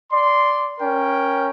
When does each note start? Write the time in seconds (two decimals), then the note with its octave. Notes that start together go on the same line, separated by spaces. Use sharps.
0.12 D5 C6
0.80 C#4 A#4 G5